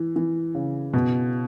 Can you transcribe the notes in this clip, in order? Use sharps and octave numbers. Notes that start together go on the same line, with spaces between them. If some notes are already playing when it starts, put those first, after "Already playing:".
Already playing: E3
E3
C#3
B2